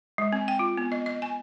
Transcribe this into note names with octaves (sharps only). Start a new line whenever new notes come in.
G#3
C4
G5
F4
B3
D#5
D#5
G#5